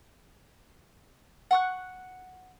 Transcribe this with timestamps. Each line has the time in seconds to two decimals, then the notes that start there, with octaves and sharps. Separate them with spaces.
1.51 F#5 C#6 F#6